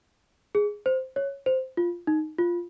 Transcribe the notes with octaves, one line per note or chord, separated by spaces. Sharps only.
G#4
C5
C#5
C5
F4
D#4
F4